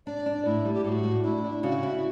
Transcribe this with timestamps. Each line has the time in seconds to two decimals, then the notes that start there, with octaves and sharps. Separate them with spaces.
0.06 D4 D5
0.26 D4
0.45 A2 E4
0.65 G3
0.74 G4
0.84 A2 F#4 G4
1.04 A2
1.23 D4 E4
1.44 D4
1.63 C#3 F#4
1.83 E4